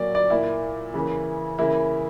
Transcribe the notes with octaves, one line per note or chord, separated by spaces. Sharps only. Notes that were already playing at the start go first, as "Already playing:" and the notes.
Already playing: A#2 F#3 A#3 D5
D5
A#2 A#3 E4
C#3 E3 A#3
C#3 E3 A#3 E4